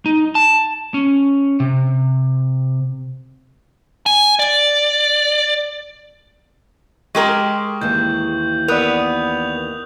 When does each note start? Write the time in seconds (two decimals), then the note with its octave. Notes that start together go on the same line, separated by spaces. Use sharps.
0.06 D#4
0.35 A5
0.94 C#4
1.60 C3
4.06 G#5
4.39 D5
7.15 G#3 G4 A#4 C#6 F#7
7.81 D#2 E3 G6
8.68 B3 A#4 D5 D#6 F#6 F7